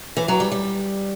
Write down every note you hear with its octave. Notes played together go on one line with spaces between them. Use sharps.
E3
F#3
G3
G3